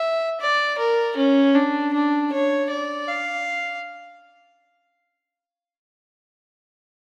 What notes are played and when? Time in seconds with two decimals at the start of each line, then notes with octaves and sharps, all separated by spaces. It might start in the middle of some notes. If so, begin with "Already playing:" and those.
Already playing: E5
0.41 D5
0.78 A#4
1.17 C#4
1.55 D4
1.93 D4
2.32 C#5
2.70 D5
3.08 F5